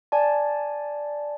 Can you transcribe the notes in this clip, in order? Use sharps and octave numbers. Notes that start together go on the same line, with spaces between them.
D5 G#5 A5